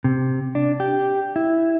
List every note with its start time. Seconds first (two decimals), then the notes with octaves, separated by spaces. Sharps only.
0.04 C3
0.55 D4
0.80 G4
1.36 E4